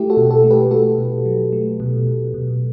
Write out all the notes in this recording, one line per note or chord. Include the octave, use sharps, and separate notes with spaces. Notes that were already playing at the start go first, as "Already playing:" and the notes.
Already playing: A3 E4 G4
F#4 A4
B2
F#4 A4
A3
G4 B4
A3 F#4 A4
B2
F#3
A3
B2
B2
B2